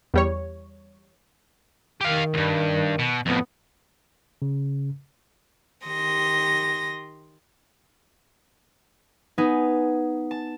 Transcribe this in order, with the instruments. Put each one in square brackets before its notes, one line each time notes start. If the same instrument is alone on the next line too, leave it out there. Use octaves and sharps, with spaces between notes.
[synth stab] E2 G3 C#5
[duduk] D#3 [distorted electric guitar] G4 F5
[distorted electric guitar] C#2 G2
B2
[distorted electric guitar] F2 A2 [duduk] B3
[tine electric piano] C#3
[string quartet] D#3 G4 C6 D#6 A#6
[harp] B3 D#4 G#4
A5